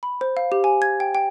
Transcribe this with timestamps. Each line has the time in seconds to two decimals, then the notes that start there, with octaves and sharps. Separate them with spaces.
0.03 B5
0.21 C5
0.37 F5
0.52 G4
0.64 G#5
0.82 G#6
1.00 G5
1.15 G5